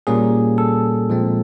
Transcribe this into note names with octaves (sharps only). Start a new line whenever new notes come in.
A#2 G3 A#3 C#4 G#4
A4
A#2 F3 G#3 C4